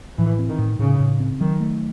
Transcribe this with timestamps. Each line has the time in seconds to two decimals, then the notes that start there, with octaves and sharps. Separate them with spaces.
0.18 A2 E3
0.39 C4
0.49 D#3
0.58 A2
0.79 A2 C#3
1.00 A2
1.20 C4
1.40 D#3 F#3
1.61 A3